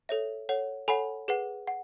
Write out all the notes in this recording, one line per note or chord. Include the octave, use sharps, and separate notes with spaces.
A4 C#5 E5
A4 C#5 F#5
A4 C#5 F#5 G#5 B5
G#4 B4 F#5
F#5